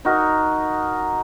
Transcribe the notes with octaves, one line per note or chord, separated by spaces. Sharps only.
D#4 F#4 A#4